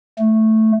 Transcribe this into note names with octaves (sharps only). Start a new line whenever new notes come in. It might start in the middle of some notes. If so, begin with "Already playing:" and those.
A3